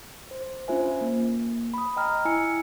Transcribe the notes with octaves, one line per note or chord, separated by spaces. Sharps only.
C5
C#4 D4 F4 C5 E5 G#5
A#3
B5 D#6
D#5 G5 A#5 F6
E4 G#5 E6 C#7